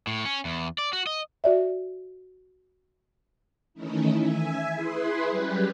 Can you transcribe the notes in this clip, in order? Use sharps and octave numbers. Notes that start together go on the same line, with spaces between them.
A2
C#4
E2
D5
F#4
D#5
F#4 D5 E5
D#3 E3 A3 C#4 D#4 E4
E5 G#5
E4 G#4 B4 C6
F#3 G3 C#4 G4 B4